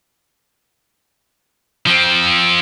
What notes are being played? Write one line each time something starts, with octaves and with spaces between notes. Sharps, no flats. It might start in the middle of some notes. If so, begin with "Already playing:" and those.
F3 C4